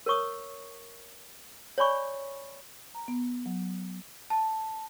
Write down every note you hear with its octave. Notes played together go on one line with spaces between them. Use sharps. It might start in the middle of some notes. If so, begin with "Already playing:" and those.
A#4 C#5 C#6 D#6
C#5 D5 G#5 B5 C#6
A#5
B3
F#3
A5